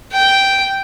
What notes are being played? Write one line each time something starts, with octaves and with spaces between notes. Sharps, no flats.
G5